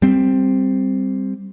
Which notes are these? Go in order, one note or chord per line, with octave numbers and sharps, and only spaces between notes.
G3 C4